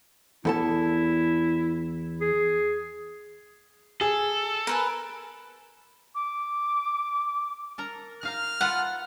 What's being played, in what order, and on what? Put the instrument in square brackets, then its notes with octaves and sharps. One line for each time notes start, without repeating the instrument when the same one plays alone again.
[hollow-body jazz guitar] E2 A4 A5 [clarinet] E4
[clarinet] G#4
[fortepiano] G#4 [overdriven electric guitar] A4
[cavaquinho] A#4 B4 G#5
[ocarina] D6
[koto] A4 A#4 A#5
[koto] D#4 F5 A#5 [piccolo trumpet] F6
[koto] F4 A4 B4 [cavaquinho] F#5